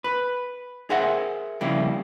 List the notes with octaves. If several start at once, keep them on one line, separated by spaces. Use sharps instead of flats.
B4
G#4 A#4 C5 E5 F#5
F2 C#3 G3 A#3 E4